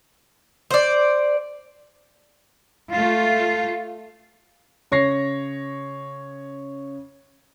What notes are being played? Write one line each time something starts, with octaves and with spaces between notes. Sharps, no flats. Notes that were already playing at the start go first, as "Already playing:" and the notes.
C5 D5
A3 F4
C#3 C#5 C#6 A#6 C7